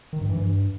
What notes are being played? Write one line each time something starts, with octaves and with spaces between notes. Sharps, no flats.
D#3
G2
E3
G2